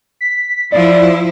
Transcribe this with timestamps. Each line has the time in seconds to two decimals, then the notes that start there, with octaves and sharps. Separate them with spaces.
0.21 B6
0.72 F3 E4 D5